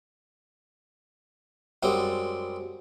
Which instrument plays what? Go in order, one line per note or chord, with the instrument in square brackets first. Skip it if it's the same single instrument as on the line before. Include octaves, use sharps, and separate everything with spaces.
[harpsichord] F#2 G3 G#3 C4